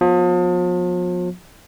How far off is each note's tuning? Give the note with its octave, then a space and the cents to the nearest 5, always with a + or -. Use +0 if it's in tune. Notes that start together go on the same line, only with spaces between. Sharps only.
F3 +40 B3 +0